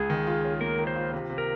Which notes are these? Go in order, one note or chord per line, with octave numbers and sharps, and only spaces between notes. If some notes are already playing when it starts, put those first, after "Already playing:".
Already playing: C#2 G#4
D#3
F4
C#4
A#3 A#4
D#3
C5
F4
C3
C3
A#4